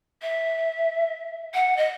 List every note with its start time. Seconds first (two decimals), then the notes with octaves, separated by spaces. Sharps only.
0.22 E5
1.54 F#5
1.76 D#5